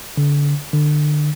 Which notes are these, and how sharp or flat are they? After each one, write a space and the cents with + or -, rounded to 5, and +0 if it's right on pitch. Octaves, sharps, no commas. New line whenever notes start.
D3 -30
D3 +25